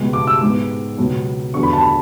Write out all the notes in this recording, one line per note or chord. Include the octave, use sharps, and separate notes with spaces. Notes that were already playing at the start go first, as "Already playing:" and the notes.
Already playing: C#2 B2 G#3 B3
D6
E6
G#2 G#3 B3 D6
C#2 B2 F#3 B3
E2 D3 F#3 B3 C#6
B5
A5
B5